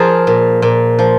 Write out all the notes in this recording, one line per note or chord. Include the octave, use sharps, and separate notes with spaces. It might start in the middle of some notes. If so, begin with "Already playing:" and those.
Already playing: F3 F4 G#4 A#4
A#2
A#2
F3